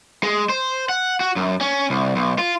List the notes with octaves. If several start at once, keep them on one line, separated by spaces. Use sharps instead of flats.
G#3
C5
F#5
F#4
F#2
C#4
C2
B1
F4